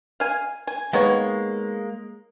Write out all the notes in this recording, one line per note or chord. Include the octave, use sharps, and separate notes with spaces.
F5 G#5
G#5
D#3 G#3 A#3 B3 C#5